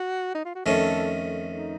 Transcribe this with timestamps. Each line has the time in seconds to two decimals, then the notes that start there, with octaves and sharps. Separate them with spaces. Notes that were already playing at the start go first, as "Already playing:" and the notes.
Already playing: F#4
0.35 D#4
0.45 F4
0.55 F#4
0.66 F2 D#3 A3 C#4 A4
1.57 D#4